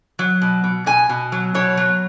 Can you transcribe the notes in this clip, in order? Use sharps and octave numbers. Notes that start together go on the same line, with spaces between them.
F#3
B2
B2
B2 G#5
B2
F#3
B2 C#5
F#3